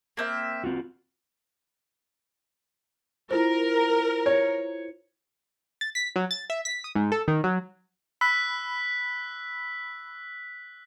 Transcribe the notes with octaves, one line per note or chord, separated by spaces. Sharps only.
A#3 C4 E5
C4 F4 F#4
E4 F4 A#4 C5
C#5
A6
B6
F#3
A6
E5
B6
D#6
G#2
A4
D#3
F#3
B5 E6 F#6 B6